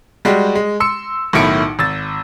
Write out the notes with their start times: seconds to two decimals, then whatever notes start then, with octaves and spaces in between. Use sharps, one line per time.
0.25 G3 G#3 F#4 G4
0.55 G#3
0.80 C6 E6 C#7
1.33 B1 A2 D#3 E4 C#7 D7
1.79 G#1 E6 A6